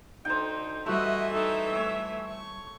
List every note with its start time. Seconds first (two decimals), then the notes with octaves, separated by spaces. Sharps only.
0.25 D2 D3 D#4 C5 G5
0.86 E3 G3 A3 E4 F#4 D#5 E5
1.33 D#4 A4
1.75 A3 C#5
2.26 C#6